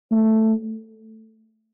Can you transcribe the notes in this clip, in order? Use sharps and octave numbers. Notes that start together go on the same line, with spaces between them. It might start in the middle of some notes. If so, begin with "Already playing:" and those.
A3